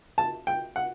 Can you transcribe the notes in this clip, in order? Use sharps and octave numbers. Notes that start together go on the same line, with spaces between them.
A5
G5
F#5